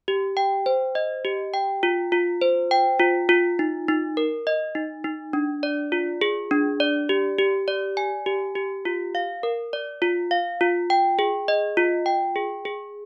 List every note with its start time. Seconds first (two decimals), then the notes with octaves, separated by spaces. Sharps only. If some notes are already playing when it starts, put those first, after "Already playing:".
0.08 G4
0.37 G5
0.66 C5
0.95 D#5
1.25 G4
1.54 G5
1.83 F4
2.12 F4
2.41 C5
2.71 G5
2.99 F4
3.29 F4
3.59 D#4
3.88 D#4
4.17 A#4
4.47 D#5
4.75 D#4
5.04 D#4
5.33 D4
5.63 D5
5.92 F4
6.21 G#4
6.51 D4
6.80 D5
7.09 G4
7.38 G4
7.68 D5
7.97 G#5
8.26 G4
8.55 G4
8.85 F4
9.15 F5
9.43 A#4
9.73 D5
10.02 F4
10.31 F5
10.61 F4
10.90 G5
11.19 G#4
11.48 D#5
11.77 F4
12.06 G5
12.36 G#4
12.65 G#4